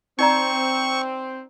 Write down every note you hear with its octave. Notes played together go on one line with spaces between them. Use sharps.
C4 D#4 D5 A#5 C#6